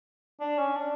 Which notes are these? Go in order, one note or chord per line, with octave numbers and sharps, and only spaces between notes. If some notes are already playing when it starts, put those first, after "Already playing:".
D4
C#4
D4